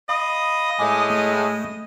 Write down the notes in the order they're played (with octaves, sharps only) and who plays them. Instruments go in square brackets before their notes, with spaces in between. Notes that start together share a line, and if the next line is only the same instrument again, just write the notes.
[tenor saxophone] D#5 [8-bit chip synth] F5 B5 D#6
[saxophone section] A2 G#3 [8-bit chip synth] G#5 D6
[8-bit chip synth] A3